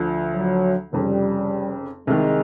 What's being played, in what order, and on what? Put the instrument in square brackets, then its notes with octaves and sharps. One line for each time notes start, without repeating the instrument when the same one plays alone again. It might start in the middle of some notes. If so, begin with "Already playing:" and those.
Already playing: [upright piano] D2 D3 F3
[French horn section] F#3
[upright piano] F1 F2 C#3 [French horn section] G3
[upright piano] C2 C3 D#3 [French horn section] G#3